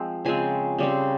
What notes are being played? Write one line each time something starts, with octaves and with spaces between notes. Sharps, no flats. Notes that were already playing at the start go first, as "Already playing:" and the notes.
Already playing: F3 G#3 C4
C#3 F3 G#3 C4 G#5
C#3 G3 C4